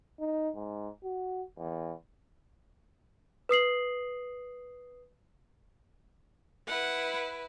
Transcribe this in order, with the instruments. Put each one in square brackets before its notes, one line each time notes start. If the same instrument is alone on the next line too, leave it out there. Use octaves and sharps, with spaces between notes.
[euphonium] D#4
G#2
F#4
E2
[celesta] B4 D#6 C7 F#7
[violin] E4 B4 [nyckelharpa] F#5